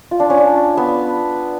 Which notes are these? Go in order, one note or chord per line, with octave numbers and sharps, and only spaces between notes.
F4
D4
C#4
D4
B3